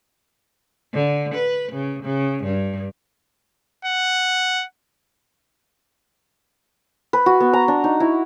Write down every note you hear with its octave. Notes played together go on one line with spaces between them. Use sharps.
D3
B4
C#3
C#3
G2
F#5
B4
F#4
B3
A#5
D4
D#4
E4